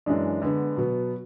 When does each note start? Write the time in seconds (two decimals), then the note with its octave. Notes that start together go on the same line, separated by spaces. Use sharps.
0.06 F#2 E3 G#3 D4
0.42 D3 G#3 B3
0.77 B2 F#3 B3